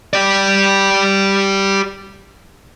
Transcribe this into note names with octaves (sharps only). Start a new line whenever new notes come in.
G4 D5